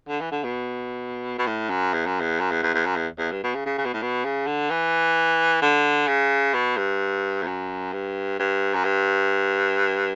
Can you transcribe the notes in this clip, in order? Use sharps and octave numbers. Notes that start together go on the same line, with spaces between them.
D3
E3
D3
B2
B2
A2
F#2
E2
F#2
E2
F#2
E2
E2
E2
F#2
E2
E2
G2
B2
C#3
C#3
C#3
B2
A2
B2
C#3
D3
E3
D3
C#3
B2
G2
E2
F#2
G2
G2
F#2
G2